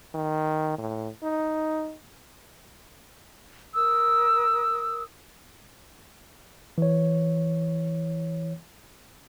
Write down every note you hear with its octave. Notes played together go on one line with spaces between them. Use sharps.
D#3
A2
D#4
A#4 D#6 E6
E3 C#5